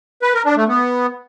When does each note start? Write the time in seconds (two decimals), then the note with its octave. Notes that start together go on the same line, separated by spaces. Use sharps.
0.22 B4
0.34 A#4
0.45 D4
0.57 A3
0.68 B3